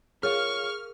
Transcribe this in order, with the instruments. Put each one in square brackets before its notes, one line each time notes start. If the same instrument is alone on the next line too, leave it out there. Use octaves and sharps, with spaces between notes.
[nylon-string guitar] F4 C#5 [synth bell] G#4 A#4 F5 [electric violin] C#6 [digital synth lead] F6